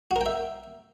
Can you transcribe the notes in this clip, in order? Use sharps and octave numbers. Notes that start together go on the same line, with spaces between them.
F#4
A#4
G5
E5